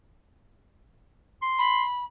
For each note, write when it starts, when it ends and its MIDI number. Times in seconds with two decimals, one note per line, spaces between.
1.42 1.84 84
1.58 2.05 83